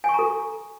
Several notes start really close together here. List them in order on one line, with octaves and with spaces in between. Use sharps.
G#5 C#6 A#5 A4